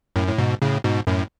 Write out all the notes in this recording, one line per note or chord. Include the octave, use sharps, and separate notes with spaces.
F#2 A2
A2
G#2 B2
A2 C#3
G#2 B2
F#2 A2